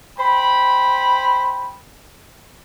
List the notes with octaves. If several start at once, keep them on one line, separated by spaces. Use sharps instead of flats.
C5 G5 B5